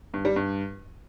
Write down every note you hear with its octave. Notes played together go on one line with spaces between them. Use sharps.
G2
G3
G2